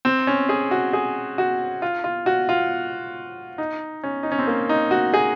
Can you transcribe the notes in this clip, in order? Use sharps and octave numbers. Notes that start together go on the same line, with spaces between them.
C4
C#4
G#4
F#4
G#4
F#4
F4
F4
F#4
F4
D#4
C#4
D#4
C#4
C4
A#3
D#4
F#4
G#4